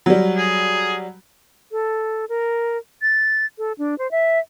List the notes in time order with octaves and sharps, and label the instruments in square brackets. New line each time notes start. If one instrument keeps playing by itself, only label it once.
[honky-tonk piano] F#3 G3
[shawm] G#4
[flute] A4
A#4
A6
A4
D4
C5
E5